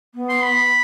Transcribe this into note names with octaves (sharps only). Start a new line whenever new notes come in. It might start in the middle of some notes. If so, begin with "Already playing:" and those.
B3
C6
B5